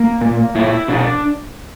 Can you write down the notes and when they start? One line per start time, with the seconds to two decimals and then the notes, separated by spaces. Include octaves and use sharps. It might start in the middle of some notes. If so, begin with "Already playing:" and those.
Already playing: A#3
0.21 A#2
0.55 A#2 E4
0.88 B2 D4